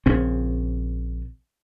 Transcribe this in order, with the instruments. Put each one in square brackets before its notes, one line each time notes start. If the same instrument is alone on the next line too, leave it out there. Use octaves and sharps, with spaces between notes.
[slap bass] A#1 C#3 C4